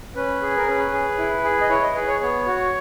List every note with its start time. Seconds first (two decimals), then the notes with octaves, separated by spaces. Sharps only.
0.16 C#4 B4
0.42 G#4
0.57 A#4
0.67 C#4 B4
0.93 G#4
1.18 E4
1.44 G#4
1.61 D#5
1.70 E4 C#5
1.83 D#5
1.95 G#4 B4
2.08 C#5
2.21 B3 C#5
2.46 F#4